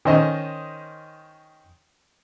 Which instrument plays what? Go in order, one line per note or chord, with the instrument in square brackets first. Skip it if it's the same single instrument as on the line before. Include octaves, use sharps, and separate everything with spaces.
[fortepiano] D#3 C#4 C5 D#5